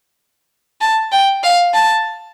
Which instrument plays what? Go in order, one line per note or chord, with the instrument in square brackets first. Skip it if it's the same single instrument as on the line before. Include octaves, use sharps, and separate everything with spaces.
[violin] A5
G5
F5
A5